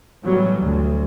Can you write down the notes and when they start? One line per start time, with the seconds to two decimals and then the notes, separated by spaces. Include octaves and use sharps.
0.24 A2 E3 F#3 G3 B3
0.59 D2